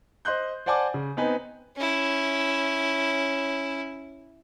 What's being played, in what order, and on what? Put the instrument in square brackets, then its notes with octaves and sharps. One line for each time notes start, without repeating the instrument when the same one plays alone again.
[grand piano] C5 D#5 C6 F#6 G6
C5 D5 F#5 G#5 A5 D6
C#3
B3 C4 D#4 B4 G#5
[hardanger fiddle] C#4 E4